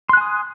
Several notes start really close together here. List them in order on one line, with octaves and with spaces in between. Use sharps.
C6 F#6 G#5 D#6